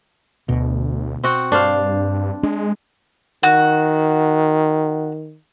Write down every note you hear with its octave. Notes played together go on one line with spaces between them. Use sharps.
D2 B2
C4 F#4 G5
G2 D4 C5 F5
G#3 D4
D#3 F#4